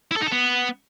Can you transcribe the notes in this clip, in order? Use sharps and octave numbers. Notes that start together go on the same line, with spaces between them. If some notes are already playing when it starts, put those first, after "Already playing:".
E4
A4
D#4
A4
B3